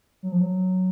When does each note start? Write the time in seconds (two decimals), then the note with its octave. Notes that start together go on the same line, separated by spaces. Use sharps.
0.23 F#3
0.32 F3
0.41 F#3